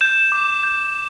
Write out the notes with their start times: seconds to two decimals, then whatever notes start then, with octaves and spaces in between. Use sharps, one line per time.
0.01 G6 E7
0.32 D6
0.63 G6